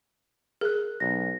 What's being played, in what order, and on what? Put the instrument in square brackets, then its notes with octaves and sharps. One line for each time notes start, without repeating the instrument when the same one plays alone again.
[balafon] G#4 [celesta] A#4 F#6
[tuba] B1 [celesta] A#6